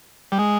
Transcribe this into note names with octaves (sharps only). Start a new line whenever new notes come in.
G3
G#3